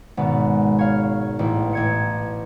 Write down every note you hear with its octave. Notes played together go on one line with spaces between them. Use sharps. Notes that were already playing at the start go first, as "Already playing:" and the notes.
G#1 B2 B3
C#5 F5
A1
A1 G#6 C#7